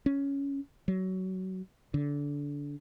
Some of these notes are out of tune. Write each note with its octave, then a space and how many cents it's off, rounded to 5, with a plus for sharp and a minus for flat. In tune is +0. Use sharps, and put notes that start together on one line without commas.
C#4 +10
F#3 +20
D3 -25